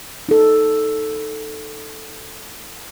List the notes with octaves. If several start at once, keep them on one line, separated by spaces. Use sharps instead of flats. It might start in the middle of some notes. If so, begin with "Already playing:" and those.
D#4 A4